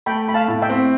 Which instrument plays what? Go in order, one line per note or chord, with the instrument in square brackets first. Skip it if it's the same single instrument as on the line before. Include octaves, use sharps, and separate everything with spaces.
[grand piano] A3 [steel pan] G5 B5
[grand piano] A3 [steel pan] B5
[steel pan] F5 A5
[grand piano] A2
[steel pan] E5 G5
[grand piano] C4